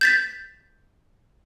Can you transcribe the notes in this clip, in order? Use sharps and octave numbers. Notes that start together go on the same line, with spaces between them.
G6 A6 B6